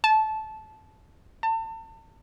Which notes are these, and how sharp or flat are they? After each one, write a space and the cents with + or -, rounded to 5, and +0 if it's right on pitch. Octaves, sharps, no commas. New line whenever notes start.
A5 -15
A5 +35